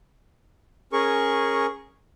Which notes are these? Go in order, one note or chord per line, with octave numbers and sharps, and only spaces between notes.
C#4 G#4 A#4 C#6